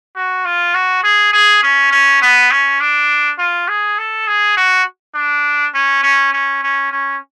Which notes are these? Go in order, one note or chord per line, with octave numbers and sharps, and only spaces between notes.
F#4
F4
F#4
G#4
G#4
C#4
C#4
B3
C#4
D4
F4
G#4
A4
G#4
F#4
D4
C#4
C#4
C#4
C#4
C#4